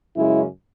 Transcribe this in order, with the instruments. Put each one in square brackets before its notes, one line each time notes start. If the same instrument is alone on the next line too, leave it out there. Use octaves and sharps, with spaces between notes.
[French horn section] F#2 C#3 G#3 C#4 E4